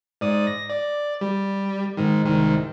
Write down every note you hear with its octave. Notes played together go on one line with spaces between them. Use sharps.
G#2 D5 D#6
A#6
D5
G3
G#2 D#3
C2 G#2 D#3